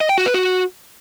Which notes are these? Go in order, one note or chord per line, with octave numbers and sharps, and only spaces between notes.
D#5
G5
F#4
B4
F#4